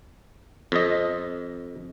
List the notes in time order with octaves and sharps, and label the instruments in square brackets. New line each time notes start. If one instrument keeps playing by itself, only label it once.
[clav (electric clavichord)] F2 D#5